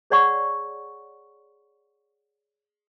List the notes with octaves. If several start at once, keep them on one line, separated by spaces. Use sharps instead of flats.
G#4 C#5 D5 F#5 C#6